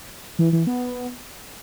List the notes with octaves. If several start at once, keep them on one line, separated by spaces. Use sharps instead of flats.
E3
E3
B3